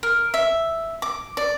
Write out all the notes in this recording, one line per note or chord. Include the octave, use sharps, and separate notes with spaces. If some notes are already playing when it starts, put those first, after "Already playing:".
A#4
E5
D6
D5